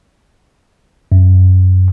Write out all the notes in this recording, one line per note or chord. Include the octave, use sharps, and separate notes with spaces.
F#2